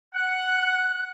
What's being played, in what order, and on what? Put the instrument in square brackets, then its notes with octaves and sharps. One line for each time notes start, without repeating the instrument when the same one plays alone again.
[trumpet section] F#5 [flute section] F#6